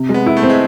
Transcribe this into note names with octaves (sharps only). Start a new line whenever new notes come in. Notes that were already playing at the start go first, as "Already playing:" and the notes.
Already playing: C3
G#3
B3
E4
A3
C4
G#3